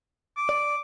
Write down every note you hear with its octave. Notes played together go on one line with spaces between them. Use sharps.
D6
D5